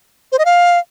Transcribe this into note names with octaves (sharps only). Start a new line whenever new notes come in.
C5
D#5
F5